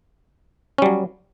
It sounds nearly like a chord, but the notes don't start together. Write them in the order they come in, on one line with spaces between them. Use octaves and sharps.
C#4 G3 F#3